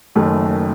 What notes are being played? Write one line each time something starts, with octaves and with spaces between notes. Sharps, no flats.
F#1 F#2 D#3 A3